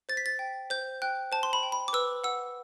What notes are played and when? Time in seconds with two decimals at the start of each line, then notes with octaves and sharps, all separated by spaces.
0.09 C5 A6
0.17 B6
0.26 A6
0.39 G5
0.70 C5 G6
1.02 G5 F#6
1.32 C5 A5
1.43 C6
1.53 B5
1.63 G5
1.72 B5
1.88 D6
1.93 B4 E6
2.24 F#5 E6